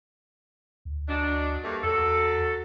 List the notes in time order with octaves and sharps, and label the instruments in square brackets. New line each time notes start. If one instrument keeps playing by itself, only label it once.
[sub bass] D2
[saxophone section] F#3 G#3 D4
G2 A3 A#3
[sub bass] E2 [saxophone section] F#3 A4